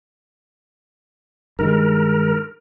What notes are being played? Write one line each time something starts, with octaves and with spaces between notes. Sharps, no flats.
G2 D#3 G#3 A#4